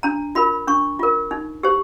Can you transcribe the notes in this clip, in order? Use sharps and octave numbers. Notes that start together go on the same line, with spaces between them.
D4 A#5
F4 A#4 B5
D4 C#6
F4 A#4
D#4
G4 C5